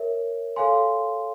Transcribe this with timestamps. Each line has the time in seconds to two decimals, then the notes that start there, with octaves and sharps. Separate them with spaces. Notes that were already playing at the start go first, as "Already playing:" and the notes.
Already playing: A#4 C#5 E5
0.56 A4 C#5 F5 G#5 C6